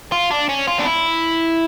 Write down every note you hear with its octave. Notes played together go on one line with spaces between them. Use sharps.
F4
D4
C#4
F4
D4
E4